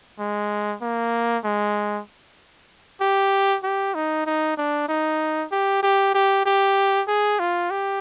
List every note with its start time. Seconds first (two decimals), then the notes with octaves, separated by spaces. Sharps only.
0.19 G#3
0.81 A#3
1.44 G#3
3.01 G4
3.63 G4
3.95 D#4
4.26 D#4
4.57 D4
4.89 D#4
5.52 G4
5.82 G4
6.14 G4
6.46 G4
7.08 G#4
7.39 F4
7.70 G4